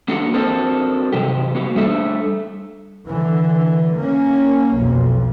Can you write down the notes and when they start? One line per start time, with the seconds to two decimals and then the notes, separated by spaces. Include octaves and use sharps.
0.08 A#3 D4 F#4 G4 A4
0.34 C4 D4 F#4 A4 A#4 C5
1.13 G2 C3 F#3 G4
1.55 A#3 F#4 G4
1.75 G3 A3 D4 A4 E5
3.06 D3 E3
3.96 A#3 C#4
4.76 B1 F2